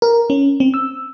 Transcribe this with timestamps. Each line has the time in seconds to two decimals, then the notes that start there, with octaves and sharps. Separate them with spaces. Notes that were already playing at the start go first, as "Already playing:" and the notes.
0.02 A#4
0.30 C#4
0.60 C4
0.74 E6